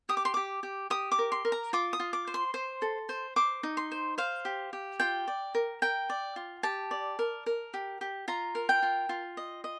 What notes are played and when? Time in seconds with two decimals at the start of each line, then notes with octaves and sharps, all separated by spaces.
0.09 G4 D#6
0.17 D6
0.25 C6
0.34 G4 D6
0.63 G4
0.90 G4 D#6
1.12 D6
1.19 A#4
1.32 C6
1.45 A#4
1.52 A#5
1.73 F4 D6
1.93 D#6
2.00 F4
2.13 D6
2.27 C5
2.34 C6
2.54 C5
2.82 A4
3.09 C5
3.36 C5 D6
3.63 D#4
3.77 C6
3.92 C5
4.18 C5 F5
4.45 G4
4.73 G4
5.00 F4 G5
5.28 D5
5.55 A#4
5.82 A#4 G5
6.10 D5
6.36 F4
6.63 G4 A5
6.91 D5
7.19 A#4
7.46 A#4
7.74 G4
8.01 G4
8.28 F4 A#5
8.55 A#4
8.69 G5
8.82 F4
9.09 F4
9.37 D#5
9.64 D#5